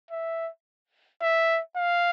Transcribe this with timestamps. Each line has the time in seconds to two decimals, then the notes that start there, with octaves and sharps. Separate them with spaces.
0.11 E5
1.22 E5
1.77 F5